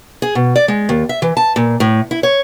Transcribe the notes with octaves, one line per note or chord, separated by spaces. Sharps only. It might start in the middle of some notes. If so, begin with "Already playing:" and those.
G#4
B2
D5
G#3
D#2
E5
E3
A5
A#2
A2
E4
C#5